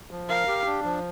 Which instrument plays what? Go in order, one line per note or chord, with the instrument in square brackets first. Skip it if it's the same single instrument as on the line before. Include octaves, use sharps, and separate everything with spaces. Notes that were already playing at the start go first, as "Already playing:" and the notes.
[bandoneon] F3
[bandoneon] A#4 [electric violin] F5
[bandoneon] G4
D4
F3